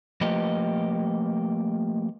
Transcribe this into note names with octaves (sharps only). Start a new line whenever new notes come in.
F3 A3 A#3 G4 B4 D#5